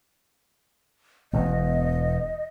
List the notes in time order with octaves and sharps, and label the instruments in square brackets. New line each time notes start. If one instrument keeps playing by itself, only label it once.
[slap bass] E1 E2 [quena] D#5